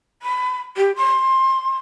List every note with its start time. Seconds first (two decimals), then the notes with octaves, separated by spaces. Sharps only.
0.22 B5
0.76 G4
0.95 C6